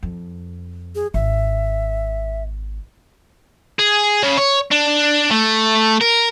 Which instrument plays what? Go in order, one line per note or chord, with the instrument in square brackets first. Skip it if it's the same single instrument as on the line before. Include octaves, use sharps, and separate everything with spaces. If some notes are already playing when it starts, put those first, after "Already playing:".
[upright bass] F2
[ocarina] G#4
[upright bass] G#1 [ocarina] E5
[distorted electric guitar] G#4
C#3
C#5
D4
A3
A#4